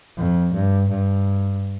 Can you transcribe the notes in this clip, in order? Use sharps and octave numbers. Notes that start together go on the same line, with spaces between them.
F2
G2
G2